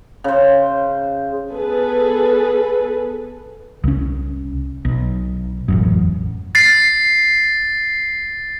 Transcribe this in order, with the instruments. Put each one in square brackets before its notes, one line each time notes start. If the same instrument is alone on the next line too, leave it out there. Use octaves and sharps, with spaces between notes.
[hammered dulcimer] C#3 C5
[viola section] B3 G#4 A4 B4
[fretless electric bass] C2 C#4
B1
E1 A1 F#2
[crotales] A6 C7